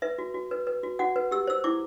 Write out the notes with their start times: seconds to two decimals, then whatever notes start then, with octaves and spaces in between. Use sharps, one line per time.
0.02 B4 E5
0.18 F#4
0.34 F#4
0.51 B4
0.67 B4
0.83 F#4
0.99 F#4 F#5
1.16 B4
1.31 G4 E6
1.47 C5 E6
1.64 E4 D6